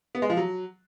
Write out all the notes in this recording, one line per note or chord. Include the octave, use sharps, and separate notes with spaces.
B3
G#3
F3
F#3